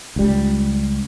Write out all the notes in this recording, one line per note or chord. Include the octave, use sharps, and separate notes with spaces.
C#2 G3